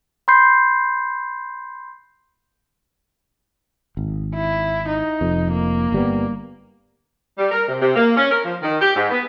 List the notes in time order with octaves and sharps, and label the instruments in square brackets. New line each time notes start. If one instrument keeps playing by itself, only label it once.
[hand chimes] B5 C6 G6 C7
[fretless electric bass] G#1
[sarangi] E4
D#4
[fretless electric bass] F1 F2
[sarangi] A#3
[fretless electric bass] G1 G3 B3
[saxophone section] G3
A#4
C3
C3
A#3
C#4
A#4
F3
D#3
G4
G#2
B3